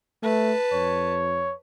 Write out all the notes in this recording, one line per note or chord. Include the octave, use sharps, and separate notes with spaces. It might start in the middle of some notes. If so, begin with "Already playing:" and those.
A3 B4 A5
F2 C#5